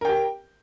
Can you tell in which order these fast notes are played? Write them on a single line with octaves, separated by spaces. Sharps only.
A#4 G5 G4